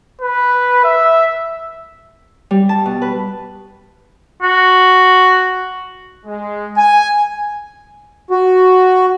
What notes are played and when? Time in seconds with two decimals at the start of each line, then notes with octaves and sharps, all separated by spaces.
0.21 B4
0.84 E5
2.51 G3
2.69 A5
2.86 B2
3.02 B4
4.42 F#4
6.25 G#3
6.76 G#5
8.30 F#4